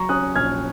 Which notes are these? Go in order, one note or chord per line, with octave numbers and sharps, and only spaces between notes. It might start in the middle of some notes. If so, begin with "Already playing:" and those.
Already playing: F#3 A#5 C#6
C#4 D#6 F#6
A#1 F6 G#6